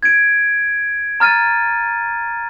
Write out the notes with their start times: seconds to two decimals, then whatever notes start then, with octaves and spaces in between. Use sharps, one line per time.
0.03 G#6 D7
1.20 A#5 F6 A6 D#7